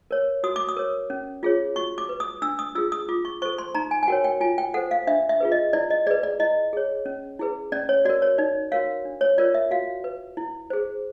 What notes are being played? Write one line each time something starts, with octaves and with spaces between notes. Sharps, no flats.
A#4 C#5
F#4 D#6
D6
D#6
A#4 C#5
C#4
F4 G#4 C#5
F#4 C#6
D6
B4
D#6
D4 E6
D#6
F4 G#4 E6
D#6
F4 D6
C#6
A4 C5 C#6
C6
D#4 A#5
G#5
G#5
F#4 A#4 C#5 G5
G5
F4 G#5
G5
A4 C5 F#5
F5
D4 E5
E5
F4 G#4 B4
D#5
E4 D5
D#5
G#4 B4 D5
D5
E4 D#5
G#4 C#5
C#4
E4 G#4 B4
C#4 D5
C#5
F#4 A#4 D5
C#5
D#4 D5
F#4 A#4 C#5 F5
D4
C#5
F4 A#4 C#5 D5
E5
F#4 F5
B4
E4
G#4 C5